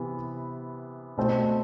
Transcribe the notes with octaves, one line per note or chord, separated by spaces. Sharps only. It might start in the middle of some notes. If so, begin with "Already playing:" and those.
Already playing: C3 E3 B3
B2 A3 C4